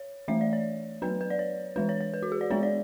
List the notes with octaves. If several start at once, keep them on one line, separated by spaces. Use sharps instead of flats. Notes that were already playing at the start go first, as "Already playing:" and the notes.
Already playing: C#5
E3 A3 D4 E5
D5
C#5
F#3 B3 D4 B4
B4
D5
C#5
E3 G#3 D4 B4
C#5
C#5
B4
F#4
G#4
D5
G#3 B3 D4 C#5
D5